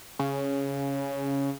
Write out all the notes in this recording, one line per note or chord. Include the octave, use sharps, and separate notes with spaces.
C#3